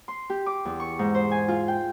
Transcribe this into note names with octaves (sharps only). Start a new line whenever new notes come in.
C6
G4
D6
E2
C#6
G#2
C5
G#5
F4
G5